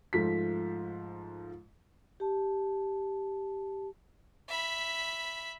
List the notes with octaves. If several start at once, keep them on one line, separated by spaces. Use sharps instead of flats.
G#2 F3 A3 B6
G4 A5
E5 B5